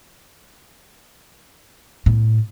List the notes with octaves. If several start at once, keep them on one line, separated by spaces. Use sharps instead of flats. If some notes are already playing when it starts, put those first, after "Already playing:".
A2